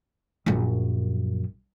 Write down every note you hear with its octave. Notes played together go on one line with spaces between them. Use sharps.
A#1 F#2